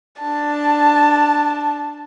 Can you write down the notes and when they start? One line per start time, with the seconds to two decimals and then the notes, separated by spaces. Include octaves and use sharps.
0.21 D4 A5